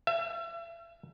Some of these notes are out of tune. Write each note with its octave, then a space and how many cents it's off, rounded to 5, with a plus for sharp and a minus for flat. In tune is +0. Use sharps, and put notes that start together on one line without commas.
E5 +35